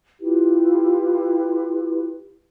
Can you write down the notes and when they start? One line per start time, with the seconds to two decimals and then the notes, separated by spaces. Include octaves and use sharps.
0.20 E4 F4 G4 B4